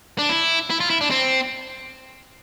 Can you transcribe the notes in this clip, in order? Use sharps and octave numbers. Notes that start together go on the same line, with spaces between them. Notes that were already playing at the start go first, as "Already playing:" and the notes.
D4
E4
E4
F4
E4
D4
C4